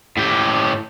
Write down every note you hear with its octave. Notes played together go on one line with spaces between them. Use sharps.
A2 G4